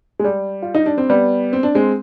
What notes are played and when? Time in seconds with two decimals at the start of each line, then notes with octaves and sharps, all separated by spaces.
0.19 G#3
0.24 G3
0.62 F4
0.75 D#4
0.86 D4
0.98 C4
1.10 G3 B3
1.53 C4
1.63 D4
1.75 G#3 C4